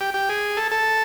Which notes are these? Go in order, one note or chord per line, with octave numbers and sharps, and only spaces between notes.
G4
G4
G#4
A4
A4